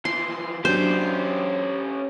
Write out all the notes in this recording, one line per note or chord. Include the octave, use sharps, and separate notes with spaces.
E3 F3 C6
F#3 C#4 D4 G4 C5